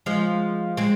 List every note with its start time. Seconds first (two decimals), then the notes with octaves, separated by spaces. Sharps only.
0.06 F3 G#3
0.77 G#3 C4